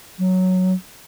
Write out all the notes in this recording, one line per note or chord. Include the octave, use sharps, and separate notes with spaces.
F#3